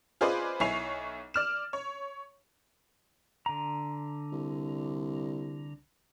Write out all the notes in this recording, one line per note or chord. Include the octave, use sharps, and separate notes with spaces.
F4 G#4 B4 C5 D5 D#5
B1 E4 C#5 G#5 C7 F7
D5 F6 E7
C#5
D3 A#5
C2